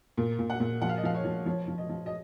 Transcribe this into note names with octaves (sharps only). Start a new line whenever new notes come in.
A#2
A#2
F#5
A#2
F3 F#5
F5
D#5
F3 F5
C#5
F3
F3 C#5
F3
D#5
F3
D#5